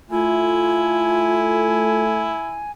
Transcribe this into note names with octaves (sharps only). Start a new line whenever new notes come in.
A3 E4 F4 G#5